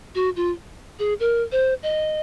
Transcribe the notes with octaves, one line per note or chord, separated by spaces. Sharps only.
F#4
F4
G#4
A#4
C5
D#5